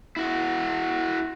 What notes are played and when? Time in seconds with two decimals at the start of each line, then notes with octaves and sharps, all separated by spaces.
0.17 E4 F#4